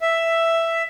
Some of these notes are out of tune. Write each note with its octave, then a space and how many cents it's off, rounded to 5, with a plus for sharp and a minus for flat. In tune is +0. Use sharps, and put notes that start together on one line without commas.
E5 +5